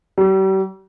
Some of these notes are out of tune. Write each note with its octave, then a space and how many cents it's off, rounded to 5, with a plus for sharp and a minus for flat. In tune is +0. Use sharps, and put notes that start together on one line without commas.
G3 -40